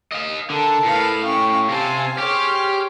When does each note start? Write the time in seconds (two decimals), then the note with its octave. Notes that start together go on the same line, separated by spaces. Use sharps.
0.12 D#5 F5
0.50 D3 A#4 A5
0.84 A2 B4 F5
1.24 C#4 F5 G5 C#6
1.69 C3 C4 C5 F5 G#5 A5
2.18 G4 G#4 C5 C#5 F6